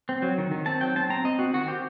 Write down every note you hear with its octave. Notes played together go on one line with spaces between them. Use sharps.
C4
F#3
D#3
D#3
C4 A5
F#3 G5
C4 A5
C4 A#5
C4 D#5
C4 F#4
D#3 F#4
C4 G4